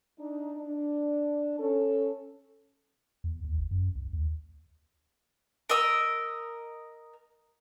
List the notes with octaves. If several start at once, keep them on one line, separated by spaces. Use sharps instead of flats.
D4 D#4
D4
C#4 A4
E2
D#2
G1
F#2
C2
D#2
A#4 D#5 E6